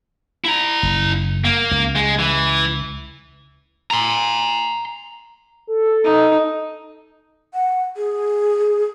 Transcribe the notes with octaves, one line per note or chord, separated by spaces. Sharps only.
E4 A#5
F#1
A#3
C#2
G#3
E3
A#5 C6
A4
D#4
F#5
G#4